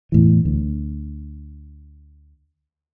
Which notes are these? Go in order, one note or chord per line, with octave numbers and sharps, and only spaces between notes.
E2 A2 E3
D2